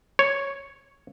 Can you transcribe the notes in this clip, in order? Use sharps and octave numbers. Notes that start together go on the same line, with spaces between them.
C#5